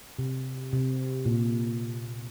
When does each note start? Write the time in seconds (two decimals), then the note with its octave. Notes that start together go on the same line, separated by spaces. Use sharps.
0.19 C3
0.73 C3
1.26 A#2